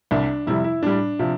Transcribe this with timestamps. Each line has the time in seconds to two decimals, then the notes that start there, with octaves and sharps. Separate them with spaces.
0.11 C2 C3 G3 D4
0.47 F2 C3 G3 E4
0.64 E4
0.82 A2 G3 D4
1.19 C3 F3